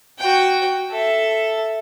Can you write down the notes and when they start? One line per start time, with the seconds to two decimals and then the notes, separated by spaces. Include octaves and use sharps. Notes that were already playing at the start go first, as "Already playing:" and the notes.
0.19 F#4 G5
0.91 A4 E5